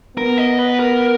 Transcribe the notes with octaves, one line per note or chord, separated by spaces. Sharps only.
B3 A#4
D#5
B4
A#4